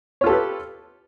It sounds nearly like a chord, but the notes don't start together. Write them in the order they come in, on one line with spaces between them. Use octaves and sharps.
C#5 F4 A4 G4 B4